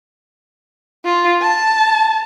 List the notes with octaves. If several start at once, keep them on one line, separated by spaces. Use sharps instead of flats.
F4
A5